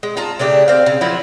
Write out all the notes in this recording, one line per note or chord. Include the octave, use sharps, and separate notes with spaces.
G#3
F4 A5 A#5
C#3 A3 D4 G4
C4 F5
C#3
F3 F#3 E4 F4